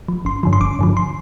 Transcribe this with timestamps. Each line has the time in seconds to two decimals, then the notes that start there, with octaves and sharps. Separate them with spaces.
0.08 F3
0.25 G1 C6
0.43 G2 D3 F3
0.53 C6
0.60 G1 D6
0.79 G2 D3 F3
0.97 C6